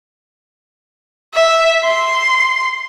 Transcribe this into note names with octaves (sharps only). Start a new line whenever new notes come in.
E5
C6